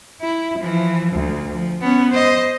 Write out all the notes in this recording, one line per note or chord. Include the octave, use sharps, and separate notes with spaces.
E4
E3 F3
D2
F3
B3 C#4
C5 D#5